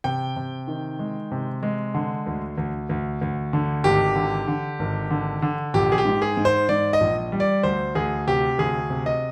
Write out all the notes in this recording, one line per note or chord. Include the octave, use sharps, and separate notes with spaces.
C3 G5
C3
D#3
G#3
C3
G#3
D3
D2
D2
D2
D2
D3
G#1 G4
D3
D3
G#1
D3
D3
A#1 G4
G#4
G4
G#2
G#4
G#2
C5
G#2 D5
D#5
A#1
G3
D5
D2 C5
D2 G#4
C3 G4
D2 G#4
C3
D#5